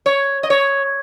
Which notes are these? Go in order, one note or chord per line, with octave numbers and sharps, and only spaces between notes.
C#5
D#5
C#5